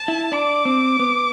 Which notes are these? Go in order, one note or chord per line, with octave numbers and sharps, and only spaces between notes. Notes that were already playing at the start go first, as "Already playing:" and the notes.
Already playing: A5
E4
D4 D6
C4
B3